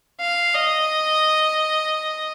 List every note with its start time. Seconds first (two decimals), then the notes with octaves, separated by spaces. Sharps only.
0.21 F5
0.55 D#5